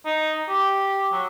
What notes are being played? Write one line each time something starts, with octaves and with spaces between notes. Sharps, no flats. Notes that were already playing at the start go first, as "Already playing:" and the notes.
D#4
G4
F#3